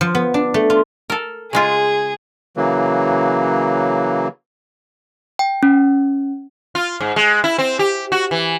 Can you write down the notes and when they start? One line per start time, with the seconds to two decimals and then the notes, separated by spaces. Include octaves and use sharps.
0.01 F3
0.15 B3
0.34 D4
0.54 A3
0.70 F4
1.10 A4 A#4
1.53 C#3 G#3 F4 G#4
2.57 C#3 E3 F#3 A#3
5.39 G5
5.63 C#4
6.75 F4
7.01 G#2
7.16 G#3
7.44 E4
7.58 C4
7.79 G4
8.12 F#4
8.31 E3